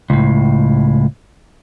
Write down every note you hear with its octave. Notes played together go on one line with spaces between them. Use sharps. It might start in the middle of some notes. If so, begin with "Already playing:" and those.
C#2 A2